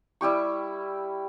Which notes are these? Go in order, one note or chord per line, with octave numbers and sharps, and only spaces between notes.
G3 E4 G4 C#6